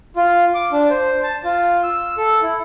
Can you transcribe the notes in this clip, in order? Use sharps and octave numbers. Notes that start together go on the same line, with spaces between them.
F4
D6
D4
C5
A5
F4
E6
A4
E4